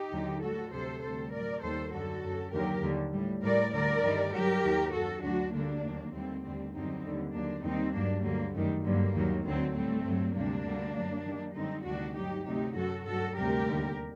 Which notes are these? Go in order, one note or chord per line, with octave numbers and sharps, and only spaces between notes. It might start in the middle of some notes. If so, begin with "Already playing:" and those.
Already playing: D#4 G4
D#2 D3 F#3
A2 G3 F#4 A4
D2 C3 F#3 A4 C5
D2 C3 G3 A4 C5
A2 F#3 A#4 D5
D#2 D#3 G3 A4 C5
F#2 D3 F#3 F#4 A4
F#2 F#3
D#2 D3 F#3 G4 A#4
D#2 D3 G3
A2 G3
A2 G3 A#4 D5
D2 D3 G3 A#4 D5
G2 D#3 G3
G2 F#3 G4 A#4
D#2 D#3 F#3
F#2 F#3 F#4 A4
D2 D3 F#3 D4 F#4
D2 D3 G3 A#3 D4
D#2 D#3 F#3
D#2 D3 G3 A3 C4
D#2 D3 G3 A3 C4
F#2 D3 G3 C4 D#4
D#2 D3 G3
D#2 D3 F#3 A#3 D4
D#2 D#3 G3 C4 D#4
G2 F#3 A#3 D4
D2 D3 F#3 G3 A#3
F#2 D#3 G3 A3
G2 D3 F#3 G3 A#3
D#2 D#3 F#3
D2 D3 F#3 A3 C4
A2 G3 A3 C4
G2 F#3
D2 C3 G3 A#3 D4
D2 D3 G3
F#2 F#3
F#2 D#3 G3
F#2 D3 G3 C4 D#4
D2 C3 D#3 G3 D4 F#4
G2 F#3 D#4 G4
D2 C3 F#3 D#4 G4
F#2 F#3 F#4 A4
G2 F#3 F#4 A4
D2 C3 G3 G4 A#4
D#2 D3 G3